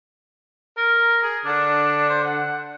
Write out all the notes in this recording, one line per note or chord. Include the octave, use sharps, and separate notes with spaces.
A#4 A#5
G#4
D3 D4
C5
F#5